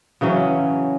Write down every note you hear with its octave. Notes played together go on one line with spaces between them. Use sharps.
C#3 E3 F#3 C#4